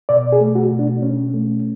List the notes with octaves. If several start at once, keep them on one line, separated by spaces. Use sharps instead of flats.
B2 D5
G#4
A3
F#4
B2
D4
B2 C#4
A3